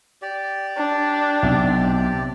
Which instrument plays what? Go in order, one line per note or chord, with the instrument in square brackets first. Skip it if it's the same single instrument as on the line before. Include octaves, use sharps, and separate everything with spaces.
[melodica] G4 D5
[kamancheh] D4
[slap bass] B1 [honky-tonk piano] C3